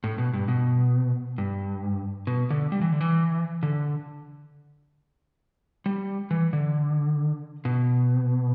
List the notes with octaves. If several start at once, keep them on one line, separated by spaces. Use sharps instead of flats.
A2
B2
G2
B2
G2
B2
D3
G3
E3
D3
E3
D3
G3
E3
D3
B2